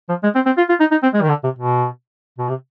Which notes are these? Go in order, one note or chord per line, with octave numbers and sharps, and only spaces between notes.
F3
G#3
C4
C4
F4
F4
D#4
D#4
C4
G#3
D#3
D3
C3
B2
B2
C3